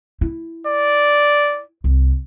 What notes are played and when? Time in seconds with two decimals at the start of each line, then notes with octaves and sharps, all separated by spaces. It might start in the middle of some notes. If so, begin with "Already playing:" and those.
0.21 E4
0.67 D5
1.84 C2